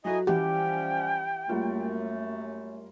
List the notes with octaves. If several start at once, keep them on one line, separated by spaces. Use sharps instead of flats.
F#3 D#4 E4 F#4 A4 D#5 G#5
E3 F3 G3 C#4 G4 F#5 G5
F#2 G3 A3 A#3 F4